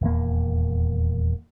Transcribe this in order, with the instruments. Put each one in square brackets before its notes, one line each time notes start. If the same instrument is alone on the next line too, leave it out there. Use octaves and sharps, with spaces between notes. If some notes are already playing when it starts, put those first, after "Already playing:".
[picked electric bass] D#1 E2 A#3